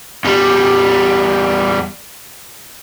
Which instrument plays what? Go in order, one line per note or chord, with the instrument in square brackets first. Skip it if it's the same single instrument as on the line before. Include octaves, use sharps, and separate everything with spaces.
[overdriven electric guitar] E2 G3